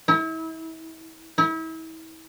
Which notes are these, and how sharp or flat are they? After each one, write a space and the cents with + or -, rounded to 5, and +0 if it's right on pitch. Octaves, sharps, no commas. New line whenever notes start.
E4 -35
E4 -35